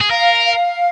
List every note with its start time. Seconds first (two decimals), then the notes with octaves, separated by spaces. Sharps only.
0.01 G#4
0.11 A#4 F5
0.45 F5